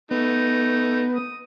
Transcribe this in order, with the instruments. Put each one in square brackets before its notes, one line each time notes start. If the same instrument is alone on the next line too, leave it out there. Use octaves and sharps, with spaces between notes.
[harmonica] A3 D#4 [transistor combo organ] B3
[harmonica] D#6